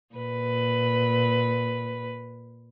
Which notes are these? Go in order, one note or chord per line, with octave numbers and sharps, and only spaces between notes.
A#2 B4